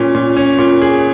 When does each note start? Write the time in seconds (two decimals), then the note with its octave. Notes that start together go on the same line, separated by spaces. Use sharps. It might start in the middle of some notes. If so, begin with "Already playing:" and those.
Already playing: A#2 C#4
0.15 A#2
0.37 C#4
0.58 A#2
0.82 G#4